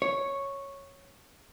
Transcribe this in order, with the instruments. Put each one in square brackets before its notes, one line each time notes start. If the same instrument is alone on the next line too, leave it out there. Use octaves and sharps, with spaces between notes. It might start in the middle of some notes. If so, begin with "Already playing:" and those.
[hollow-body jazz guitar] C#5